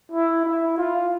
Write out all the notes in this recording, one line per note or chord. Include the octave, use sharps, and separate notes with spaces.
E4
E4
F4